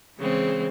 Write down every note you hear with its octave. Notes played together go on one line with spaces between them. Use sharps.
C#3 E3 G#3 C4